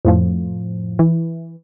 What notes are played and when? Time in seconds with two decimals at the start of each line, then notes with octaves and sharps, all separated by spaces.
0.05 F2 A2 F3
0.99 E3